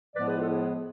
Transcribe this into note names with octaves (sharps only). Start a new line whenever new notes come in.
A2 F3 G#3 B3 B4 D5
G#4 B4
F4 A4
E4 G#4